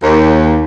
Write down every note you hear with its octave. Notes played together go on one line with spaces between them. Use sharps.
D#2